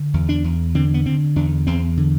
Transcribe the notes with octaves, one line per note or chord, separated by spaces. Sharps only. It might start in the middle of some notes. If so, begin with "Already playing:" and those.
Already playing: D3
E2
D4
E2
D3 C4
B3
D3 C4
E2 D4
E2 C4
D3